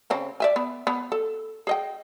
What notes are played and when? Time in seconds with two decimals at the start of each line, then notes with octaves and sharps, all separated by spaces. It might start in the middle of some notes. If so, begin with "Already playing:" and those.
0.10 C#3 C4 C#4
0.40 D5 E5 G#5
0.56 B3
0.87 B3
1.12 A4
1.67 G#4 D#5 G5